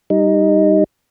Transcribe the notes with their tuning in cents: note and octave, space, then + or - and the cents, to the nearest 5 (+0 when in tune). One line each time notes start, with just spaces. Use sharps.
G3 +0 D#4 +0